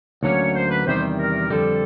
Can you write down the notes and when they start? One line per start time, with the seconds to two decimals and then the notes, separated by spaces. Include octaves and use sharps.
0.23 D2 D3 F#3 A#3 C#4 C#5
0.55 C5
0.71 B4
0.87 E2 C3 D#3 G3 C5
1.19 A#4
1.50 F2 D3 G3 A4